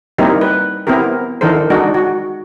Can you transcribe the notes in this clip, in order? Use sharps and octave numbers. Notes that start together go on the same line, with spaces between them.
G3 A#3 C4 D#4 E4 G4
B4
B3 C4 E4 G4 A#4
D#3 E3 D4 A4 A#4 C5
G#3 D4 D#4 F#4
F#4